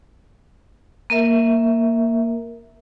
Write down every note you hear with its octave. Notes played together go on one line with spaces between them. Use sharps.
A#3 A#4 E5